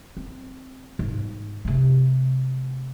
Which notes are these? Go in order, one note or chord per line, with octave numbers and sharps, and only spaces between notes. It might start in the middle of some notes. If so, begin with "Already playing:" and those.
C4
G#2
C3 A3